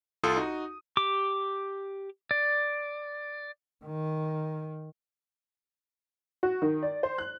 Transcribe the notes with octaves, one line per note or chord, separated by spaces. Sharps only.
C2 F4 A4 C6 D#6
D#4 F#4
G4 D6
D5
D#3
F#4
D#3
D5
C5
F#6